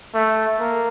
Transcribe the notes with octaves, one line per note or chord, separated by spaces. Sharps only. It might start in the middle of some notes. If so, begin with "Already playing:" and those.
A3
A#3